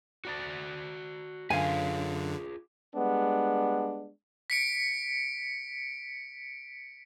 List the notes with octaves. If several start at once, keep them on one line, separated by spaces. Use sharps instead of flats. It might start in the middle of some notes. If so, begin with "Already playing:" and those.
F#4 D5 A5
F#2 D3 F4 G#4 B4 F5 G#5
G3 G#3 B3 D4
B6 C#7 D7